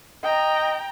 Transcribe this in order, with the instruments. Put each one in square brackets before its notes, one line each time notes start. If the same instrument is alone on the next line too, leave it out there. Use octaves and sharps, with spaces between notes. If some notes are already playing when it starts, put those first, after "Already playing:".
[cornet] D#5 [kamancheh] G5 A#5